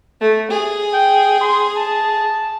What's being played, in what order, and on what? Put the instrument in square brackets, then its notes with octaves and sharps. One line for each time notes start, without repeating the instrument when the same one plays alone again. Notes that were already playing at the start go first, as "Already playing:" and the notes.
[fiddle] A3
G#4
[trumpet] G5
C6
A5